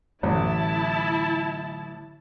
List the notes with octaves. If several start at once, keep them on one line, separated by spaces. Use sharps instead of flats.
A1 D3 F#3 A3 E4 A5